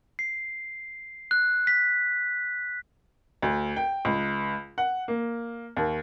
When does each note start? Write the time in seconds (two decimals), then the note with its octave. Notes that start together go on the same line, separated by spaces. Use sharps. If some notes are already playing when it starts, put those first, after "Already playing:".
0.19 C7
1.31 F#6
1.67 B6
3.42 D2
3.76 G5
4.05 C#2
4.78 F#5
5.08 A#3
5.77 D#2